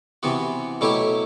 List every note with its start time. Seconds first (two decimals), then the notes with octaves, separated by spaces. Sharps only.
0.23 C3 E3 B3 F#4
0.81 B2 F#3 A3 E4 G4